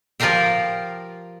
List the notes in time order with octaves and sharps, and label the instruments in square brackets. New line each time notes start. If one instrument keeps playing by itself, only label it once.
[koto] F3 F4 G4 A#4 F5 G5